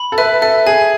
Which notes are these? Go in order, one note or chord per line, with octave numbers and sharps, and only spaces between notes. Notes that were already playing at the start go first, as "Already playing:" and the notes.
Already playing: B5
A4
B4 E5
A4 E5
G#4 G#5